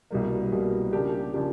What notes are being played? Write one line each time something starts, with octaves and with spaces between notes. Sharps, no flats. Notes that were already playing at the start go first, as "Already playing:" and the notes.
C2 B2 G3 A#3
C2 B2 G3 A#3
C#3 F3 A#3 D4 G4
C#3 F3 A#3 D4 G4